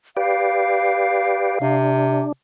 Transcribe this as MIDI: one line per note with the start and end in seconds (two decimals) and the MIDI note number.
0.17 1.59 67
0.17 1.59 71
0.17 1.59 74
0.17 1.75 77
1.62 2.25 48
1.62 2.32 62